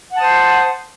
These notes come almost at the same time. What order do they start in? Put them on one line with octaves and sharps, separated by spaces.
F#5 A5 D#6 C5